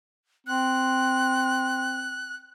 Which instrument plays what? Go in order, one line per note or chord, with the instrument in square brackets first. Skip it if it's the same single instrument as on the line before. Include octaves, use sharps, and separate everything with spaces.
[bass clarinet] C4 [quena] F#6